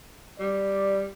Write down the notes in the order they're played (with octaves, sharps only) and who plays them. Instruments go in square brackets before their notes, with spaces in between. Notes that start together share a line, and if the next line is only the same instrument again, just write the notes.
[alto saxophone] G3 [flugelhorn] D5